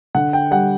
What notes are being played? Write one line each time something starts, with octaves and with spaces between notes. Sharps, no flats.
D3 F#5
G5
G3 F#5